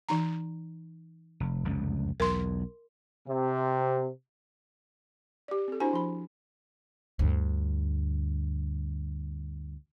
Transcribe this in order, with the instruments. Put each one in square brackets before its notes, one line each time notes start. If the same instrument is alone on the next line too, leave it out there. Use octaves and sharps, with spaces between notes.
[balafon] E3 D#4 A#5
[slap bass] F1
F1 C#2 F#2
[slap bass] B1 E2 [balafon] A#4 C6
[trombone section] C3
[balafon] G4 D5
C4 A4
D4 E4 F#4 C5 G#5
F3 B5
[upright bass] D2 G2